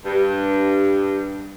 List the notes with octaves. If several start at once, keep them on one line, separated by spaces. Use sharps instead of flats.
G2